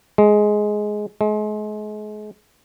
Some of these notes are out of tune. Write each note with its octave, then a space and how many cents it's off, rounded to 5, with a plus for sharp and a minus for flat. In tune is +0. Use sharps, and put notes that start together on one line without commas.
G#3 +10
G#3 +35